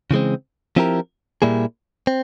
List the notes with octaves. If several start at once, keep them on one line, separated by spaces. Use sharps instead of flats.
C#3 E3 G#3 C4
F3 C4 E4 G4 A#4
A#2 G3 A#3 E4 G#4
C4